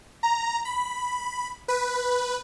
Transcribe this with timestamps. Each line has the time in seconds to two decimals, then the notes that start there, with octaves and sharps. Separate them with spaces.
0.23 A#5
0.65 B5
1.68 B4